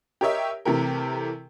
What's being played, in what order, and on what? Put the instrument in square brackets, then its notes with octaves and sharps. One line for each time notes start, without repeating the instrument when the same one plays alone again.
[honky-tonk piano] G4 A#4 C#5 D#5 E5
C3 E3 A3 G4 A4 A#4